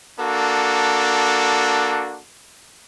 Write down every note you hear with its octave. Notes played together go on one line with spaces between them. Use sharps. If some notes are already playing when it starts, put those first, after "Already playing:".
A#3 D4 F#4 A4